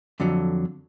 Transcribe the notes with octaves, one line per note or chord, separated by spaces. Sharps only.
F2 D3 F#3